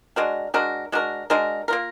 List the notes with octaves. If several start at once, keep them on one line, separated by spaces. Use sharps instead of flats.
G#3 D4 F#4 A#4
G#3 D4 F#4 A#4
G#3 D4 F#4 A#4
G#3 D4 F#4 A#4
A#3 F4 A#4